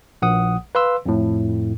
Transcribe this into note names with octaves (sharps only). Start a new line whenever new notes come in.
A#1 F#5 D#6
B4 F5 C6 E6
F2 A2